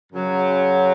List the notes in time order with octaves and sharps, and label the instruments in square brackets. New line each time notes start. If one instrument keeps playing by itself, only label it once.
[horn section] F#2 C#3 F#3